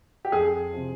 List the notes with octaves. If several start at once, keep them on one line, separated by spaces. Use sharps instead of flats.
G4
F2 G#4
C3 F3